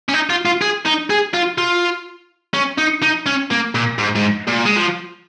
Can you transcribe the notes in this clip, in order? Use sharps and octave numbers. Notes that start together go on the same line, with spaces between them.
C#4
D#4
F4
F4
G#4
D#4
G#4
F4
F4
C#4
D#4
D#4
C#4
A#3
A#2
G#2
G#2
A#2
G#3
F3